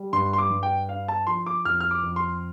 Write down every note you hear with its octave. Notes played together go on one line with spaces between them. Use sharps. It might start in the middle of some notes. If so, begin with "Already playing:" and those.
Already playing: G3
G2 C6
C6
D6
G2
G5
D4 F5
A5
F3 C6
D6
F2 F6
F6
D6
F2
C6